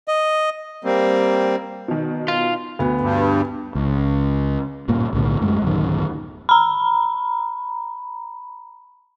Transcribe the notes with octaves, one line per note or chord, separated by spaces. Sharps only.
D#5
G3 A#3 C4
B2 D#3
F4
D2 B2 B3
G2
C#2
D1 G2 A#2 A#3
B1 A2 D3
F#2 G#3 A3
D1 F#2 D#3
A#5 B5